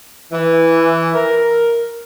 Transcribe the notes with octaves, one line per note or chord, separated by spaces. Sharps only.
E3
A#4